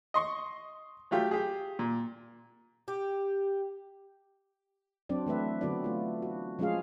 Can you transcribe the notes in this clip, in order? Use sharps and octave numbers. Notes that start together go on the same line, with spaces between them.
D#5 C6 C#6
F#3 A3 F4 G4
G4 G#4
A#2
G4
F#3 C4 D4 D5
E3 A3 B4 E5
D3 F#3 B3 E4 F#4 D5
A3 F4
F#4
F3 G#3 C#4 F4 G#4 F5